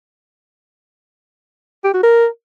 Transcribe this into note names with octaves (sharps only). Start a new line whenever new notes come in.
G4
F#4
A#4